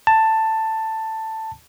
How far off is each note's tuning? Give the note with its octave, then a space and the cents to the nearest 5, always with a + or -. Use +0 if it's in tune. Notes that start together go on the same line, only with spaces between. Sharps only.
A5 +10